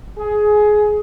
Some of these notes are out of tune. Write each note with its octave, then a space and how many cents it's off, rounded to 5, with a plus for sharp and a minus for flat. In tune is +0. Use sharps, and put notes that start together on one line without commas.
G#4 +15